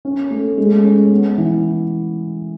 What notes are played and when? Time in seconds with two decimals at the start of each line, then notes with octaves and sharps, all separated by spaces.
0.05 C#4
0.31 A3
0.58 G#3
0.84 C#4
1.11 B3
1.38 E3